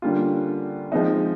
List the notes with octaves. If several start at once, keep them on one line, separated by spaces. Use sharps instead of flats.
D3 G3 A#3 C#4 F4
F3 G#3 C4 D#4